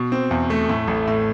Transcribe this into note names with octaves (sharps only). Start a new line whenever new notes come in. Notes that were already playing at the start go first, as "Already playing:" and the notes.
Already playing: B2
C4
E2
A3
A2
A1
A2